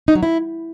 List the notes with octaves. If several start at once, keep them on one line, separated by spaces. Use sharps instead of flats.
D#4
F#3
E4